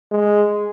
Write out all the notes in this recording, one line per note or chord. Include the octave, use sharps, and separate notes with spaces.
G#3